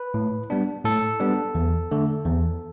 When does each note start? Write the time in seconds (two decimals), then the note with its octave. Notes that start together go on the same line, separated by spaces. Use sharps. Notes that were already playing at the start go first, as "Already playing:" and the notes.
Already playing: B4
0.14 A2
0.50 G3 B3 D4
0.85 A2 A4
1.20 G3 B3 D4
1.55 E2
1.91 D3 A3
2.26 E2